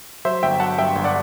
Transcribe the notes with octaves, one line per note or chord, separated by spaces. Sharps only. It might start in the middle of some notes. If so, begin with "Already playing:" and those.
F#3 C5 E5
G1 E5 G5
F#3 F#5 A5
G2 E5 G5
G1
D5 F#5